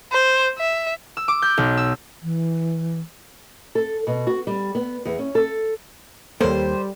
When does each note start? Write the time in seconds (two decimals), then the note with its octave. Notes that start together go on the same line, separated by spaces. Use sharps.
0.12 C5
0.58 E5
1.17 E6
1.28 D6
1.42 G6
1.58 B1
1.77 E6
2.22 E3
3.75 A4
4.07 B2
4.27 F#4
4.47 G3
4.75 B3
5.05 E2
5.19 C#4
5.35 A4
6.41 D#2 G3 A#3 A4 A#4 C5 C#5